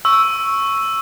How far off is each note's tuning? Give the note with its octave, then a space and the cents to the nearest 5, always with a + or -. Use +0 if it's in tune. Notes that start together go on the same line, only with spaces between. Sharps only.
C#6 +0 E6 +0